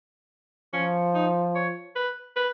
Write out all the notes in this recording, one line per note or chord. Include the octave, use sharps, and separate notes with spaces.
F3 C#4
D#4
C#5
B4
B4